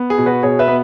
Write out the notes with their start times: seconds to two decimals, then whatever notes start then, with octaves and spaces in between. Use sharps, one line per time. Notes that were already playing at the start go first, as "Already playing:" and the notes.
Already playing: B3
0.10 G#4
0.18 B2
0.26 F#4 B4
0.43 B2 G#4 C#5
0.59 B4 E5
0.68 B3